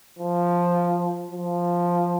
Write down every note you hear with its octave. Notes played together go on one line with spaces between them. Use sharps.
F3
F3